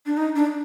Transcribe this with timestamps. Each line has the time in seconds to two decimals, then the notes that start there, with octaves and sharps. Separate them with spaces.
0.06 D4
0.17 D#4
0.36 D4